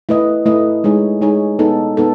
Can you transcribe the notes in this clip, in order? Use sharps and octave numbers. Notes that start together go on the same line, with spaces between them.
A3 E4 B4 D#5
A3 E4 B4 D#5
G#3 D#4 G#4 C#5
G#3 D#4 G#4 C#5
B3 D#4 A4
B3 D#4 A4